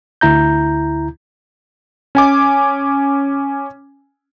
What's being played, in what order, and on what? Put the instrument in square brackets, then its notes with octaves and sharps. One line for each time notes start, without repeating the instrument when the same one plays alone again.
[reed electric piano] D2 E4 A#5 G6
[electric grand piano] C#4 G#5 D6